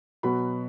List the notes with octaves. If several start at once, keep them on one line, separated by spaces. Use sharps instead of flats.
B2 F#3 B3 B5